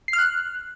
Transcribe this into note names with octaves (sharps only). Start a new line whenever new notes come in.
C7
F6
F#6